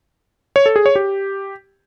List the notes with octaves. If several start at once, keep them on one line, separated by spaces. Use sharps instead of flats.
C#5
A4
G#4
C#5
G4